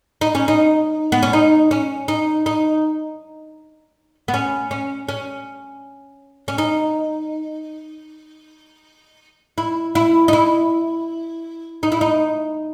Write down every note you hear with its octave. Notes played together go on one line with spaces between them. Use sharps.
D#4
C#4
D#4
B3
C#4
D#4
C#4
D#4
D#4
B3
C#4
C#4
C#4
C#4
D#4
E4
E4
D#4
E4
D#4
E4
D#4